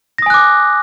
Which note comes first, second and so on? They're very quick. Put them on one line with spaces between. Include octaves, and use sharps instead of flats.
A#6 D#6 G#5 F#6 D6